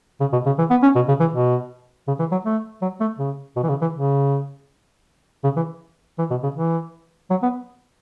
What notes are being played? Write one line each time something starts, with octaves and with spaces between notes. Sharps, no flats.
C#3
B2
C#3
E3
B3
C#4
B2
C#3
E3
B2
C#3
E3
F#3
A3
F#3
A3
C#3
B2
E3
C#3
E3
C#3
C#3
E3
E3
B2
C#3
E3
F#3
B3